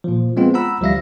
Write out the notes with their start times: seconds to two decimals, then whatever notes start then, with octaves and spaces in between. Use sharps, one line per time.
0.04 A#2 F3
0.37 G#3 B3 C4 F4
0.54 F#5 A#5 B5 E6
0.81 D2 F3 G3 E5 F5 A#6